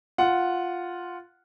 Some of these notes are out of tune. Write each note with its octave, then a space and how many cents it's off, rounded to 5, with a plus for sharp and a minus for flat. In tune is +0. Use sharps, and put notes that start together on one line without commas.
F4 +0 F#5 +0